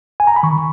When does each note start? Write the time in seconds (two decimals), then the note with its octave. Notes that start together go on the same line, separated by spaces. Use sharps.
0.20 G#5
0.27 A#5
0.36 B5
0.43 D#3 C#6